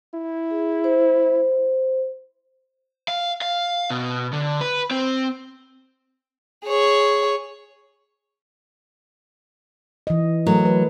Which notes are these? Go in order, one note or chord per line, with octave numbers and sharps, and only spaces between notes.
E4
G#4
C5
F5
F5
B2
D3
B4
C4
G#4 C#5
E3 D#5
F#3 A3 A4 A#4
B4